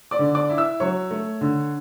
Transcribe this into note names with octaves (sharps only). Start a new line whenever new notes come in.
D5 D6
D3
D5 D6
E4
E5 E6
F#3 C#5 C#6
A3
D3